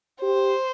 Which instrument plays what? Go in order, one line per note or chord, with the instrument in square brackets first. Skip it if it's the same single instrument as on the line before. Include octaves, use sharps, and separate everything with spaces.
[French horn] G4 [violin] C5